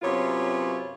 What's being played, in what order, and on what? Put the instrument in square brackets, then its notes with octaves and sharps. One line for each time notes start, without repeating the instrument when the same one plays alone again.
[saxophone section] F#2 C3 B3 F4 C#5